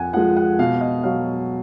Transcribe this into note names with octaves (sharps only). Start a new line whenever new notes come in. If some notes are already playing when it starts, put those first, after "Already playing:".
Already playing: F2 F#5 G#5
F3 G#3 F#5
F#5
B2 F5
D#5
F#3 F5